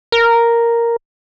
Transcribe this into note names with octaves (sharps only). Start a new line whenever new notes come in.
A#4